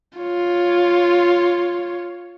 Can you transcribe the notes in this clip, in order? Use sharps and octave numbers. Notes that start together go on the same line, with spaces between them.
F4 C#5